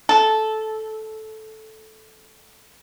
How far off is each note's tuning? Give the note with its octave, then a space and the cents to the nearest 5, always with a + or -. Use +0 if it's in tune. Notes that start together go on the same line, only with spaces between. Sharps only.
A4 -10